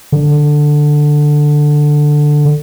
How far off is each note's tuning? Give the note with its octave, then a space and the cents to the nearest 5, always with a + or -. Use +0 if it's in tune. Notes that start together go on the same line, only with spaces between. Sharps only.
D3 +10